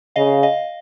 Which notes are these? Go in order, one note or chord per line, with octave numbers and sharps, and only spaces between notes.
C#3 D#5 F5
D#5 F5